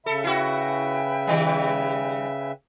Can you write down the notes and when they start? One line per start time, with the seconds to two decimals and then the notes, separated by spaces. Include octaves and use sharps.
0.06 C#3 A4 E5 B5
0.24 E4 F#4 B4 G5 G#5
1.27 D#3 G3